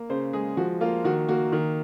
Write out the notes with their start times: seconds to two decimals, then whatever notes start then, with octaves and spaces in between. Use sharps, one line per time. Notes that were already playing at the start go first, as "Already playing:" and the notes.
Already playing: A#3
0.10 C#3 C5
0.33 G#3 G#4
0.57 F3 F#4
0.81 A#3 F4
1.04 D#3 F#4
1.29 A#3 F#4
1.52 D#3